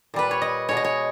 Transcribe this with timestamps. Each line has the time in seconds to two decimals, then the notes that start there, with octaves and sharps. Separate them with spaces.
0.14 A#2 G3 B4
0.31 C#5
0.42 D#5
0.69 B2 G#3 C#5
0.77 D#5
0.85 C#5